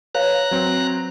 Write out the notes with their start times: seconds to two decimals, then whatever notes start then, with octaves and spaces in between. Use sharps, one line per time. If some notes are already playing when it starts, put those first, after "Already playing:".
0.15 B4 C#5 F5 A#5 F#6
0.51 F#3 C4